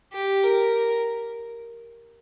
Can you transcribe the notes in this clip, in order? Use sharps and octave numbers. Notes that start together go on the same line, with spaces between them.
G4
A#4